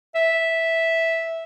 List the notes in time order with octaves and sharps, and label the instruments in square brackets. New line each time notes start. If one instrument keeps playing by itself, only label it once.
[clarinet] E5